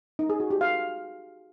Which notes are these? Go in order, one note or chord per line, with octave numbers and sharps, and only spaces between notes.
D#4
G#4
F#4
G4
F5